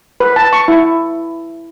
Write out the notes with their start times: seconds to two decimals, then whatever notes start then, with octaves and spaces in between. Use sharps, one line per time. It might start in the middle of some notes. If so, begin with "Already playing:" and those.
0.20 B4
0.36 A5
0.53 C#6
0.68 E4